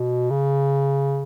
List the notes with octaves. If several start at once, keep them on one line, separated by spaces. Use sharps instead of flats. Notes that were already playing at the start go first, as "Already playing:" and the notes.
Already playing: B2
C#3